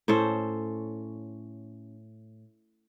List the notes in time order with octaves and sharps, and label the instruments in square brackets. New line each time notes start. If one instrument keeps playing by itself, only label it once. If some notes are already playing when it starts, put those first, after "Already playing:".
[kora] A2 C#4 A4 C5